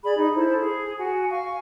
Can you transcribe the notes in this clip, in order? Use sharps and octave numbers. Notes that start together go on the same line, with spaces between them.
G#4 D5 B5
D#4
E4 A4 C5
G#4
F#4 G#5
F5 G#5 C#6